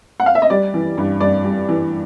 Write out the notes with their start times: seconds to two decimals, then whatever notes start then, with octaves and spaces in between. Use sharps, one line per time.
0.20 F#5
0.26 F5
0.35 E5
0.42 D#5
0.50 G3 D5
0.74 E3
0.98 G2
1.20 G2 D5
1.44 G3
1.69 E3